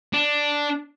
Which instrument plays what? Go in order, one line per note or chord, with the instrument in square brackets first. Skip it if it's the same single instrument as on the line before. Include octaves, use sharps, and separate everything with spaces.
[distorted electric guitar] D4